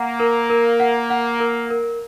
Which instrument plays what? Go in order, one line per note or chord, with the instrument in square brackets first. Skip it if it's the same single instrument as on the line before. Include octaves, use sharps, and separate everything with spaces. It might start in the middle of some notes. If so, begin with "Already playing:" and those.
Already playing: [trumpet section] A#3 [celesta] F#5
[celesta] A#4
A#4
F#5
F#5
A#4
A#4